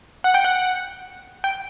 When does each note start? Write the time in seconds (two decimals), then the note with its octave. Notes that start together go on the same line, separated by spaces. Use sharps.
0.24 F#5
0.34 G5
0.45 F#5
1.44 G5